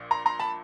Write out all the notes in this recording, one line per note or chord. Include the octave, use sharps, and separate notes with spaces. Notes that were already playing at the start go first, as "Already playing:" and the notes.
Already playing: A#1 A#2
A#5 C6
A#5 C6
A5 B5